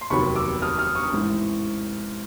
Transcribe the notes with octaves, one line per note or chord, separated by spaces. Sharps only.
C6
F1 D#2 D#3 F#3 B3 B5 C#6
D6 E6
D#6 F6
D#6 F6
C#6 D#6
A1 G#2 E3